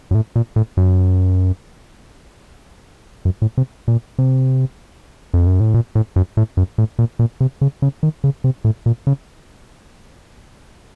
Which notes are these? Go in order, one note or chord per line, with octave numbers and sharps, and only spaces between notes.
F#2
A2
A#2
A2
F#2
F#2
A2
C3
A#2
C3
F2
F#2
A2
A#2
A2
F#2
A2
F#2
A2
A#2
A#2
C3
C#3
C#3
D#3
C#3
C3
A2
A#2
C#3